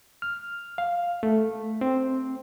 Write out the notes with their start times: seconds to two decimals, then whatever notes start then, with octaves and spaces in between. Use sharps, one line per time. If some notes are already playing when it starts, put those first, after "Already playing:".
0.22 F6
0.78 F5
1.23 A3
1.81 C4